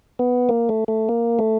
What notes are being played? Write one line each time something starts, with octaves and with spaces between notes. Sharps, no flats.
B3
A#3
A3
A3
A#3
A3